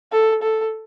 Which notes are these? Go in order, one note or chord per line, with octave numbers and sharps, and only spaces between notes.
A4
A4